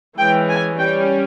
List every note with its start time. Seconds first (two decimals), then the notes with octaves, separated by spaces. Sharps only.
0.18 E3 G#3 C#4 G5
0.49 G#5
0.78 G3 C#4 G5